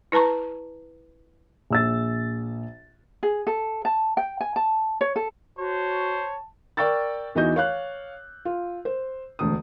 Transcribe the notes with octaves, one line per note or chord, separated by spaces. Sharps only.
E4 B4 A5 A#5 C#6
A#1 E6 A6
G#4
A4
A5
G5
G#5
A5
C#5
A4
F#4 C5 C#5 A5
A#4 D5 G5 C#6 E6 A6
E2 E3 D#4 F#4 D#5 G6
C#5 F5 F#6
F4
C5
E1 D2 D#6